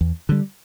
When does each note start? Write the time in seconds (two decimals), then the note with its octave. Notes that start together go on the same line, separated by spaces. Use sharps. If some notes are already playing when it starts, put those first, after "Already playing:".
0.01 E2
0.29 D3 G3